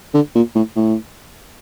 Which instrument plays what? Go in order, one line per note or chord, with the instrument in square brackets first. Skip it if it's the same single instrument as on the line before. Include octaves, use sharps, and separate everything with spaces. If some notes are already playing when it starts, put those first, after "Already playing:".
[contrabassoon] D3
A#2
A2
A2